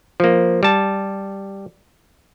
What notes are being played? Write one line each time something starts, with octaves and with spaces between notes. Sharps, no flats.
F3 A#3
G3 A5